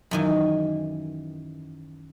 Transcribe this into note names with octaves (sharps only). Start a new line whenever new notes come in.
F#2 D#3 E3